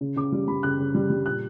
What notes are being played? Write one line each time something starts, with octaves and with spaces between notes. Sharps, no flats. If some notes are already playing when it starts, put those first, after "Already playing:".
C#3
C#3 D6
G3
G3 B5
C#3 F#6
C#3
G3
G3
A#2 F#6